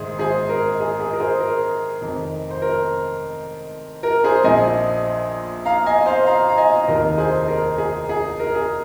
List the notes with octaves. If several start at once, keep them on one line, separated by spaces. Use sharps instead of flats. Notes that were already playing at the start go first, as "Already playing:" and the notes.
Already playing: A#1 G#2 D#3 G#4 C5
G#4 C5
A#4
G#4
G#4
A#4
G#4 C5
A#4
F1 F2 D#3
C5
A#4
A#4
G#4 C5
A#1 A#2 F3 D#5 G#5
F5 A#5
D#5 G#5
C5 F5
F5 A#5
A#5
D#5 G#5
F1 D#2 D#3 A#4 D#5
G#4 C5
A#4
G#4
G#4
A#4
G#4